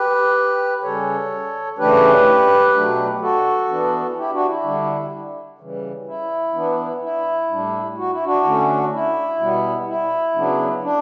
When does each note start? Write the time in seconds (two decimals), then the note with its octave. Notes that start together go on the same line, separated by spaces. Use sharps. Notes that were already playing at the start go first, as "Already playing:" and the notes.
Already playing: G4 B4
0.83 C#3 G3 C#4 A4 C#5
1.78 C#3 E3 A3 D4 G4 B4
2.74 B2 F#3 A3 D4
3.21 F#4 A4
3.68 E3 B3 D4
4.16 E4 G4
4.32 D4 F#4
4.48 E4
4.63 D3 G3 D4
5.59 C#3 E3 G3
6.07 E4
6.54 E3 B3 D4
7.01 E4
7.49 A2 G3 D4
7.97 F#4
8.10 E4
8.24 D4 F#4
8.44 D3 A3 C#4
8.92 E4
9.39 B2 G3 B3
9.87 E4
10.34 C#3 F#3 B3 D4
10.83 D4